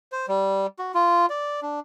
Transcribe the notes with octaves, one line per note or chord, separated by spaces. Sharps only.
C5
G3
F#4
F4
D5
D4